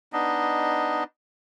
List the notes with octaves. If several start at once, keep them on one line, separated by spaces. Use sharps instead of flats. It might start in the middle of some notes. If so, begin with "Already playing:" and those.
B3 D4 D#4 D#5